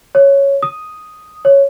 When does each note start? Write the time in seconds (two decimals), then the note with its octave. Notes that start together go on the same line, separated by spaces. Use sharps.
0.15 C#5
0.63 D#6
1.45 C#5